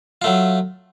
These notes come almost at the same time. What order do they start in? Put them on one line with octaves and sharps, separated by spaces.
F4 A3 F#3